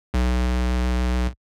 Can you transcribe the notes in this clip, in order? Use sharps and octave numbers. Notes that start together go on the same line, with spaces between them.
B1